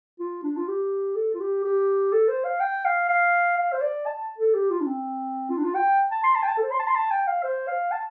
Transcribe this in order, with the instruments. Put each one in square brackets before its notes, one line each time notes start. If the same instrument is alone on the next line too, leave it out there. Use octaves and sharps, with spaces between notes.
[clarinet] F4
D4
F4
G4
A4
F4
G4
G4
A4
C5
F5
G5
F5
F5
F5
C5
D5
A5
A4
G4
F4
D4
C4
F4
D4
F4
G5
A5
C6
A5
G5
A5
A4
C5
C6
A5
C6
A5
G5
F5
C5
F5
A5